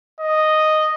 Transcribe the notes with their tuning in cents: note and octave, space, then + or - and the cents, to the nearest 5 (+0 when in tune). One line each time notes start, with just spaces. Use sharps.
D#5 -5